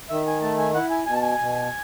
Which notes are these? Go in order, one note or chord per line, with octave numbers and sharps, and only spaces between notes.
D#3 E5
G#5
A3 A5
G#5
E4 F#5
G#5
B2 G#5
A5
G#5
B2